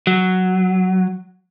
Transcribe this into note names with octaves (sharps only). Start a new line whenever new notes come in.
F#3